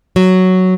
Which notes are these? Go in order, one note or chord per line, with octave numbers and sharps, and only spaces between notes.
F#3